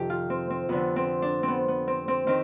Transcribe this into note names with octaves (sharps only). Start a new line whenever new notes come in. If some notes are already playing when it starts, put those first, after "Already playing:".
Already playing: F2 C3 D#3 G4
F4
C4
C4
F2 D3 B3
C4
D4
C4
B3
B3
C4
C4
D#3 C4